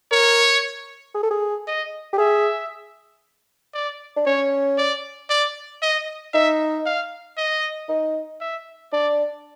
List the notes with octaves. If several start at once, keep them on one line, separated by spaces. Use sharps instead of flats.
A#4 C#5
G#4
A4
G#4
D#5
G4
G#4 E5
D5
D4
C#4 C#5
D5
D5
D#5
D#4 E5
F5
D#5
D#4
E5
D4 D5